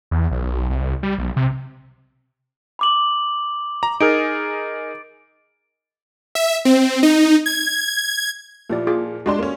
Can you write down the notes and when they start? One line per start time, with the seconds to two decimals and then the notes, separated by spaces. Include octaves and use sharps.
0.11 E2
0.31 B1
0.70 C2
1.03 G3
1.19 B1
1.37 C3
2.79 B5 D6 F#7
3.83 A#5
4.00 D#4 G#4 A#4 A6 D7
6.35 E5
6.65 C4
7.03 D#4
7.46 G#6
8.70 A#2 F3 E4 G4 D5
8.87 F4 G#4 D6
9.26 G#3 D4 F#4 G4 D5 C6
9.39 A#3 C#4